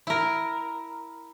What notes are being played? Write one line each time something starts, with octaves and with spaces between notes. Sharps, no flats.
E4 A#4